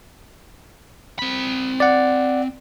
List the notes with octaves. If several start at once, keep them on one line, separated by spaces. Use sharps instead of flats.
C4 B5
D5 F#5